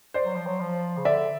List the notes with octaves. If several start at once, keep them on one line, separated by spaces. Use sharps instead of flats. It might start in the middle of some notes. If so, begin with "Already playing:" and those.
C5 D5
F#3
F3
F#3
F3
C#3
D3 D5 E5